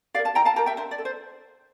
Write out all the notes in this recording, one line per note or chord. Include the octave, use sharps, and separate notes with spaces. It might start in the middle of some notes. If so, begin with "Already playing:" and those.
G4 A#4 D5 F5
F5 A5
E4 G5 A#5
F5 A5
G4 A#4 G5 A#5
E5 G5
D4 C5 E5
D5
A4
C5